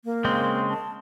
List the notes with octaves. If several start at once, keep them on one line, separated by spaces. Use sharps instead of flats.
A#3
C#3 G#3 C4
A5